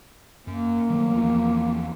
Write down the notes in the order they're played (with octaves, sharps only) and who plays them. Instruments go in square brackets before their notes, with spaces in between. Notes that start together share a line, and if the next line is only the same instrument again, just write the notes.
[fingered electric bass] F#2 [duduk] A#3
[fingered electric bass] D#3 F#3 A3
D1 E2 F3